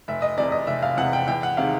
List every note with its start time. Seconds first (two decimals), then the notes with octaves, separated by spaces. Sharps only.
0.08 F1 E5
0.22 D#5
0.38 E2 C3 D5
0.52 D#5
0.67 F1 E5
0.82 F5
0.97 E2 C3 F#5
1.13 G5
1.28 E2 G5
1.43 F#5
1.57 C3 D#3 G#3 F5